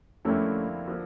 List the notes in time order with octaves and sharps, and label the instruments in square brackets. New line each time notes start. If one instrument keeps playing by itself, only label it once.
[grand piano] F2 D3 G3 A#3 E4 [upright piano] A3 C#4
[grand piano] D3 F3 A#3